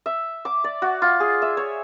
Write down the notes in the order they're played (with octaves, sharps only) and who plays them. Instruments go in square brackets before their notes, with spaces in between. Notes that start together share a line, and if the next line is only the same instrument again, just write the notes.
[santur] E5
D6
D5
F#4
F4
G#4
E5
C#5